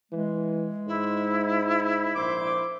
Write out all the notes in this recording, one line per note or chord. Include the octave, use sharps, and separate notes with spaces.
E3 G#3
G#2 E4
A#1 C5 C6 D6